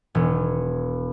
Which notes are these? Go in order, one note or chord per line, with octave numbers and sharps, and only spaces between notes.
E1